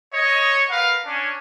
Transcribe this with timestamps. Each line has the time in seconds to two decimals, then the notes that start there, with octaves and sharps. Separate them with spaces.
0.13 C#5 D#5
0.69 A#4 B4 F5 F#5
1.06 C#4 D4